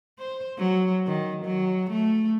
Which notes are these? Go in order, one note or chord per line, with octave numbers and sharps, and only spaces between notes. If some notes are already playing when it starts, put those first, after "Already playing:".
C5
F#3
D#3
F#3
A3